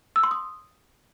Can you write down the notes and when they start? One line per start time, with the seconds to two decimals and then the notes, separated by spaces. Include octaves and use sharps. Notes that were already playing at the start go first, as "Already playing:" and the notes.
0.16 E6
0.23 C6
0.31 D#6